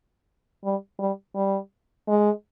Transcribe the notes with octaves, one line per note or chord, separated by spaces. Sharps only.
G3
G3
G3
G#3